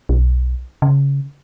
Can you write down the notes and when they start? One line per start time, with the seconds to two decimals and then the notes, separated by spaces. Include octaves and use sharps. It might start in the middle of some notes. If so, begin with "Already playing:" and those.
0.09 B1
0.82 C#3